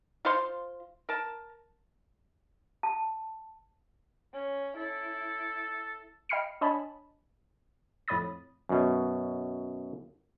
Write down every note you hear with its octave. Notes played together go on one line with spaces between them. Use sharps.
F4 C5 F5 C6
A#4 A5
A5
C#4
E4 A4
D#5 G5 B5 F6 C7 C#7
D4 C#5 D#5 G#5 A5 B5
F2 A2 C#5 B5 D#6 A6
F#2 B2